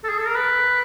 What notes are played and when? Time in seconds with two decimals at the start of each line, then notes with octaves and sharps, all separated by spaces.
0.04 A4
0.09 G#4
0.18 A4
0.27 A#4
0.35 B4